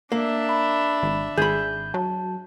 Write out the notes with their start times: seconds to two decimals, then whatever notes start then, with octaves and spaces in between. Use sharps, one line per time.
0.12 A#3 D4 E5
0.49 B5
1.03 G#1
1.38 G#1 G#4 B5 G6
1.94 F#3 A5